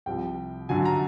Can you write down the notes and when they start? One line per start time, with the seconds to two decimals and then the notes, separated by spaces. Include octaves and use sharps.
0.06 C2 C3 F3 G5
0.69 F#2 D3 F#3 G#5
0.85 A#5